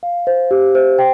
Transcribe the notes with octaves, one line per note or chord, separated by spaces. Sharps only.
F5
C5
G4
C5
G5